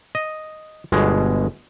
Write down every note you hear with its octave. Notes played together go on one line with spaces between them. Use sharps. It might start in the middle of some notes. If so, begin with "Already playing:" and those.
D#5
G1 B2 G#3